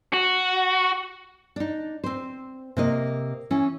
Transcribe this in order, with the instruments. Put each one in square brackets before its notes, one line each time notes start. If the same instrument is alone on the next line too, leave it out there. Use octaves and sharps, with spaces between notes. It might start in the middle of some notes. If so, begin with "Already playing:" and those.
[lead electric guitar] F#4
[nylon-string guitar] D4 D#4
C4 C5
C3 A#3 D#5
E3 C#4